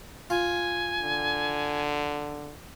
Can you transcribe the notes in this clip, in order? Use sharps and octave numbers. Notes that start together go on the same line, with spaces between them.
F4 G#5
D3